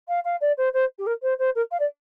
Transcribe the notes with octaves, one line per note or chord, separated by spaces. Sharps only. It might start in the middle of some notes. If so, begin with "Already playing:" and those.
F5
F5
D5
C5
C5
G4
A#4
C5
C5
A#4
F5
D5